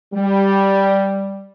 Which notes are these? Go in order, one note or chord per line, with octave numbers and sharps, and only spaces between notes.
G3